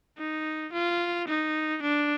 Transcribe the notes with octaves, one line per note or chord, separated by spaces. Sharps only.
D#4
F4
D#4
D4